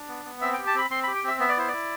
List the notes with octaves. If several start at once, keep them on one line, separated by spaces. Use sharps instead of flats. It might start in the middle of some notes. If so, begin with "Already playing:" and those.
Already playing: D4
B3
B3
C4 E5
G5
G4
A5
C4 B5
C4 C6
B5
G4
G5
C4 E5
B3 E5
D5
E4 C5
D5
E4